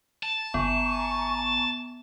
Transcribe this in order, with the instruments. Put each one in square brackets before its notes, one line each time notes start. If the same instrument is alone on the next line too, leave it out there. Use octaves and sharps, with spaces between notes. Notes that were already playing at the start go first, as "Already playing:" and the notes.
[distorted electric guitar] A5
[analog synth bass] G1 [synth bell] B3 [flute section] G#5 A#5 C#6